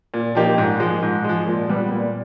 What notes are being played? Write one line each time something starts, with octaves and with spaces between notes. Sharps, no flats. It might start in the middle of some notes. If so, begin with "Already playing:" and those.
A#2
F3 A#3 D#4 G4
G#2
F3 G#3
G#2
F3 G#3
A#2
G3 B3
A#2